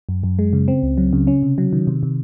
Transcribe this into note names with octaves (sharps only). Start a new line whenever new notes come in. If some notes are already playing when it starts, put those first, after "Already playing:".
F#2
F#2
G#3
C#3
C4
C#2
F#3
C#3
C#4
C3
F#3
D#3
C3
C3